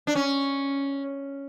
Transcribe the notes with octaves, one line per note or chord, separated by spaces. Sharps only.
D4
C#4